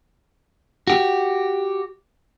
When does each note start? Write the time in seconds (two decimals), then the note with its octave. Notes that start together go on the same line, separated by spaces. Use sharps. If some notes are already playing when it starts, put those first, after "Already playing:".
0.87 F#4 G4